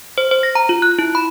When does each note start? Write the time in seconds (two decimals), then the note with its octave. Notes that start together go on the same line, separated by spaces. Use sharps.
0.18 C5
0.31 C5
0.43 A#6
0.55 A#5
0.69 F4
0.82 F#6
0.99 E4
1.15 B5